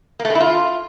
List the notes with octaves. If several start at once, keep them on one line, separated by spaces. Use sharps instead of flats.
A#3
A3
G#3
E4
F4